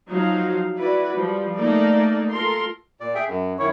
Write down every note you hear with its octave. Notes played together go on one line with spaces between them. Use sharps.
F3 F#3 D#4 C5 F5
E4 F#4 B4 D5
F3 G3
A3 A#3 D#4 A4 A#4 D5
F4 A4 A#4 C6
A#2 D5
G#4 E5 G5
F#2
F#2 D#3 E4 C#5